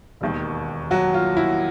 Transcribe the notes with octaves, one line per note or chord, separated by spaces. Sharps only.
E1 D#2 D#3
F#3 F#4
F4
E4